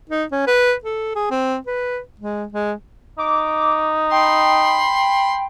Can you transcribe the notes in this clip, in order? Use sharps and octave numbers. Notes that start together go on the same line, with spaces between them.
D#4
C#4
B4
A4
G#4
C4
B4
G#3
G#3
D#4 D6
G5 B5 C6